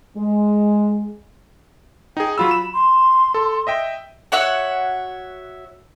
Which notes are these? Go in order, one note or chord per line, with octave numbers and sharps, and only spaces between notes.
G#3
D#4 G#4 G5
F#3 F4 B5 E6
E7
C6
A4
D#5 E5 G5
F#4 C#5 E5 F#5